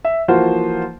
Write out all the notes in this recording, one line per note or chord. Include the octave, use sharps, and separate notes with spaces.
E5
E3 F3 A#3 F4 F#4 C5